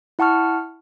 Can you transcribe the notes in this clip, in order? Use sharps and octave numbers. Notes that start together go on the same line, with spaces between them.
E4 F#5 A5 C#6 F6